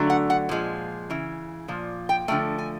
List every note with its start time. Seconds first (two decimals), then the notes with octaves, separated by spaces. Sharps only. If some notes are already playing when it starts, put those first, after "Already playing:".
Already playing: D3 F#3 A3
0.10 F#5
0.30 F#5
0.49 A#2 F3 G#3
1.10 C#3 E3
1.68 A#2 F3
2.09 G5
2.28 D3 F3 A3 G5
2.59 G#5